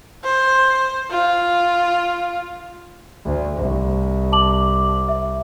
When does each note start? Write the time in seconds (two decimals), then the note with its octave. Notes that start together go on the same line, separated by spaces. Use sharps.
0.24 C5
1.11 F4
3.25 D2
3.56 C2
4.32 A5 D6 F#7
5.09 E5